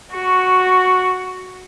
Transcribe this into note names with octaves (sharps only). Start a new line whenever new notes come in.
F#4 C#6